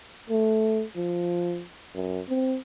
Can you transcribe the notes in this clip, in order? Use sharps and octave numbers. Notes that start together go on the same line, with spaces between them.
A3
F3
F#2
C4